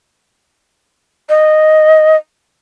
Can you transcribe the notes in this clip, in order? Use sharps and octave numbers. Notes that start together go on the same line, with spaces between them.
D#5